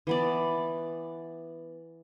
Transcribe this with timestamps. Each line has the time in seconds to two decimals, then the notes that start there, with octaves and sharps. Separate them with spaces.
0.07 E3 B3 D5